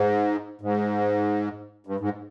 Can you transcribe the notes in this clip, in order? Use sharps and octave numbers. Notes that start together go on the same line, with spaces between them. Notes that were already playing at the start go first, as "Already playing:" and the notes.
Already playing: G#2
G#2
G2
G#2